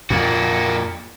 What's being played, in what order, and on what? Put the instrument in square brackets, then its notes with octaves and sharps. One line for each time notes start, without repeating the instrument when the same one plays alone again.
[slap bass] F2 A#2 [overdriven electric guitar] A#3 F#4